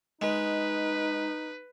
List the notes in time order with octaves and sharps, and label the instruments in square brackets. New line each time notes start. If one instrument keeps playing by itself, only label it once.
[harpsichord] G#3 [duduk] D#4 [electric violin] B4